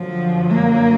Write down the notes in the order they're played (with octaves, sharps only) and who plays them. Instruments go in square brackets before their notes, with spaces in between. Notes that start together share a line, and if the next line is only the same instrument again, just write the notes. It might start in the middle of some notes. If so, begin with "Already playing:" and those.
Already playing: [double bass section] F#2 D3 F#3 [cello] F3
[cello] A#3